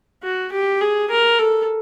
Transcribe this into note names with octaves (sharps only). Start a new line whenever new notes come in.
F#4
G4
G#4
A#4
A4